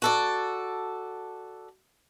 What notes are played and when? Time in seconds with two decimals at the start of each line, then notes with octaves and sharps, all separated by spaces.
0.02 F#4 A4 D5